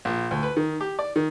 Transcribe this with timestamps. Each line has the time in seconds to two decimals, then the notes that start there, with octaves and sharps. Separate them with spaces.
0.05 A#1
0.31 D2
0.43 B4
0.57 D#3
0.81 G4
0.99 D5
1.16 D#3